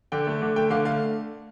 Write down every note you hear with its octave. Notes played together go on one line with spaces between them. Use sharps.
D3 G5
A3
D3
A3 G5
D3 F5
A3 F5